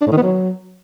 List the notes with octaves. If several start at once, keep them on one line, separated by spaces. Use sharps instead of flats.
D4
A2
D#3
B3
F#3